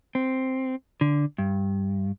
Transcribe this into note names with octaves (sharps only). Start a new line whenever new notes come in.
C4
D3
G2